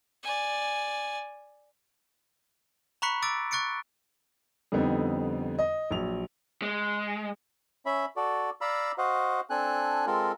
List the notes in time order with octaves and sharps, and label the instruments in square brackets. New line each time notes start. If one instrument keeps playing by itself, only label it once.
[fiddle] D5 G#5
[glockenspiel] A#5 B5 C#6 F#6 B6 C#7
D6 E6 A6 D7
C#6 F#6 A6 C#7 D7
[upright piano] F2 D3 G3 B3 C4 D#4
D#5
A#1 F#3 F7
[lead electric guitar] G#3
[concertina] C#4 E5 B5
F#4 A4 D5
D5 F5 A#5 B5 E6
F#4 C5 D#5 F5 F#5
C4 D4 A4 G#5 F#6
G#3 C4 F4 A4 A#4